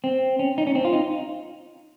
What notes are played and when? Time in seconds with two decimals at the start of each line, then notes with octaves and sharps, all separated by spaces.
0.04 C4
0.39 C#4
0.58 D#4
0.67 C#4
0.75 C4
0.85 F4
0.93 D#4